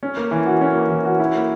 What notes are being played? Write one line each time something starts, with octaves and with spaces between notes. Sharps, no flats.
C#4
A#3
E3
F#4
C#4
A#3
E3
F#4
E4
A#3